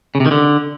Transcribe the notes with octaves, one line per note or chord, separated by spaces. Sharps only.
C#3
C3
D#3
D3